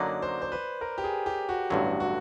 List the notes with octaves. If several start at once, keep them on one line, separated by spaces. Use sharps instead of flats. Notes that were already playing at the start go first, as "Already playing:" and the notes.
Already playing: F#2 D3 F#3 A#3 D#4 D5
C5
C5
B4
A#4
G4
G#4
G4
F#4
A1 G2 D3 F#3 F#4
F#4